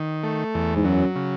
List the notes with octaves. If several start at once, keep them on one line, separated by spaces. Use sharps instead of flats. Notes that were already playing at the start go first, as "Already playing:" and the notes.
Already playing: D#3
A3
E2
G#2
F#2 F#3
C#3